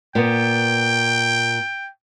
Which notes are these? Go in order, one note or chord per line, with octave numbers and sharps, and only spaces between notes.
A#2 B3 G5